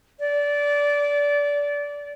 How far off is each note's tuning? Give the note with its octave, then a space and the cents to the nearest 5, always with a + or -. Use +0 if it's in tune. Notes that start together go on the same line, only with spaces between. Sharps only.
D5 -20